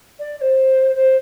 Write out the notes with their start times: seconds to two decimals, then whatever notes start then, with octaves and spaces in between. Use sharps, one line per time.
0.19 D5
0.37 D5
0.41 C5
0.95 C5